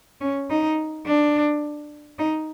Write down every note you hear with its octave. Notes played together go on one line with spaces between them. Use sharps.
C#4
D#4
D4
D#4